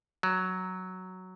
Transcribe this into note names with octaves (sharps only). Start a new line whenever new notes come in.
F#3